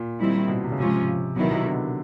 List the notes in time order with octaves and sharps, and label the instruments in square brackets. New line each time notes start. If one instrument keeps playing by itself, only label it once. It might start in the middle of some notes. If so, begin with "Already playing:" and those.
Already playing: [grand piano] A#2
[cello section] D#3 G3 C4 E4
[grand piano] B2
C3
C#3
[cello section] G#2 F3 G#3 C#4 F4 [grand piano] C3
[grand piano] B2 [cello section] D#3 F#3 B3 E4
[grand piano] C3
D3